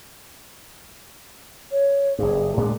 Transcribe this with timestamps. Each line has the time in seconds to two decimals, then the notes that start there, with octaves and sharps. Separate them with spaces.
1.71 C#5
2.19 F#1 G2 G#4
2.57 A2 G#3 D4